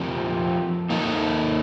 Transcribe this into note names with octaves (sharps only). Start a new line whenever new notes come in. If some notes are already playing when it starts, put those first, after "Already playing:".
Already playing: F3 C4 G4 A#4
A#3 D#4 A4